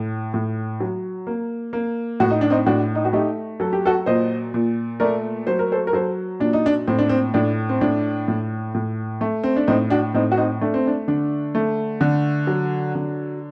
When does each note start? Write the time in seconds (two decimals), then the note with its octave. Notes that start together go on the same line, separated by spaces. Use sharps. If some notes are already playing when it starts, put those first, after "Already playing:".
Already playing: A2
0.34 A2
0.80 F#3
1.27 A#3
1.73 A#3
2.20 A2 F#4
2.30 D#4
2.41 D4
2.50 C4 D#4
2.66 A2 D4 F#4
2.95 D#4
3.05 F#4
3.13 A3 D#4 G4
3.60 F#3 A4
3.73 G4
3.85 F#4 A4
4.06 A#2 C5 D#5
4.54 A#2
5.00 A3 A#4 D5
5.47 F#3 C5
5.59 A#4
5.72 A4 C5
5.87 A#4
5.93 F#3 A4 C5
6.40 A#2 D4
6.53 D#4
6.66 D4
6.87 A2 C4
6.98 D4
7.09 C4
7.34 A2 D4
7.69 C4
7.81 A2 D4
8.28 A2
8.74 A2
9.21 A3
9.43 C4
9.56 D4
9.67 A2 C4 D#4
9.90 D4 F#4
10.14 A2 C4 D#4
10.32 F#4
10.37 C4 D#4
10.61 A3 D4
10.74 C4
10.87 D4
11.08 D3 D4
11.55 A3
12.01 D3
12.47 F#3
12.95 D3